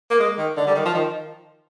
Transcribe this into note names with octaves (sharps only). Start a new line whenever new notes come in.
A#3
G#3
D#3
D3
G3
D#3
F3
D#3